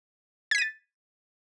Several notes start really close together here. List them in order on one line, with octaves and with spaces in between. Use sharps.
G#6 B6 D#7 A6